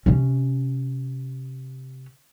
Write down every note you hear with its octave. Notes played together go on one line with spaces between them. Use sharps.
C3 C#4